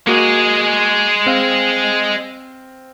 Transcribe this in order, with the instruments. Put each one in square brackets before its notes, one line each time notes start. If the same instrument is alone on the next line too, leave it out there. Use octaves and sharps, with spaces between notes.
[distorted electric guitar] G#3 G#4 [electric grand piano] A#3 F#4
[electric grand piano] C4 F5